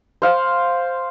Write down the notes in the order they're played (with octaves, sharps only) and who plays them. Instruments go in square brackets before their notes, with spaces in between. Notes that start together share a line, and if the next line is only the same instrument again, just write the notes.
[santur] C5 F5 F#5